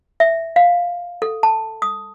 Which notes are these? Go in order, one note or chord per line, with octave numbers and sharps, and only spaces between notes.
E5
F5
A4
A5
D#6